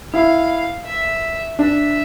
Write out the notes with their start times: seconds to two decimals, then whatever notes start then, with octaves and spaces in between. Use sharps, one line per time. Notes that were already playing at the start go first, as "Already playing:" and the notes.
0.13 E4 F5
0.86 E5
1.59 D4 E5